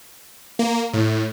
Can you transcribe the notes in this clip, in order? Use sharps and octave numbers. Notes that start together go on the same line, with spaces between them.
A#3
A2